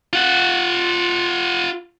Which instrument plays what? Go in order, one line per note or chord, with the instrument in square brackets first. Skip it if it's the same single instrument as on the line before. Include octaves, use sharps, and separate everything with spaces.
[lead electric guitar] F4 F#5